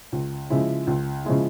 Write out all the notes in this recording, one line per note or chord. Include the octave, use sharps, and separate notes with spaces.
C#2
C#3 F3 G#3 E4
C#2
C#3 F3 G#3 E4